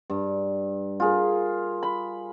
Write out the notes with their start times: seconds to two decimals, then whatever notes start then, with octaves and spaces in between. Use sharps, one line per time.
0.10 G2
1.00 F4 G#4 A#4
1.83 B5